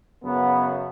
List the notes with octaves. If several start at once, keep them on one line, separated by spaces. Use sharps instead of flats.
F#2 C#3 B3